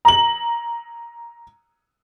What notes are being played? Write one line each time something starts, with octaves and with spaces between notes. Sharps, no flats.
A#5 F#7